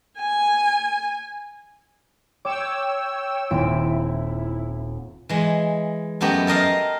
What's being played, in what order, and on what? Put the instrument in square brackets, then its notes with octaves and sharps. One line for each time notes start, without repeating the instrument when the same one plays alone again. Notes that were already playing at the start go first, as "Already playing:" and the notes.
[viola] G#5
[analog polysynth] C#5 G5 E6 [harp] D6
[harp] D#1 C4 D7 [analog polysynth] E4
[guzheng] E3 G#3
F#2 A3 B3 G4 D#5
A4 A#4 D#5 F5